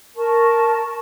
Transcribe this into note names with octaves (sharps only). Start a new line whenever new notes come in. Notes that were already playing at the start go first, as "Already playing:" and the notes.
A#4 A5 C#6